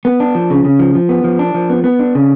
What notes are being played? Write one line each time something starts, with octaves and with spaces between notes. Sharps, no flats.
B3
D4
F3
C#3
C#3
F3
F3
B3
F3
D4
F3
B3
B3
D4
C#3